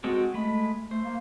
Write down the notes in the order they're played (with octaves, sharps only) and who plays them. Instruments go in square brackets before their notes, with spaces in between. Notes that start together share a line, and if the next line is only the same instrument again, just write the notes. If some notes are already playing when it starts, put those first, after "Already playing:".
[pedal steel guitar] G#3 C4 A4 [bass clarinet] F#4
[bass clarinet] G#3 [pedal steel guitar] A3 B5
[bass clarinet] A3 [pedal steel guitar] C5
[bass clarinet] A#3